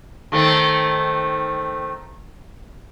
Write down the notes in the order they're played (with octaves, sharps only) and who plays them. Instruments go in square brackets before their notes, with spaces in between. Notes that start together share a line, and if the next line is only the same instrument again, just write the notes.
[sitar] D#3 A3 C4